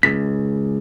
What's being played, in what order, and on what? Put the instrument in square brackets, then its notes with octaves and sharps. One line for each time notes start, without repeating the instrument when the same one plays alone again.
[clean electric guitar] C#2 [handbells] B6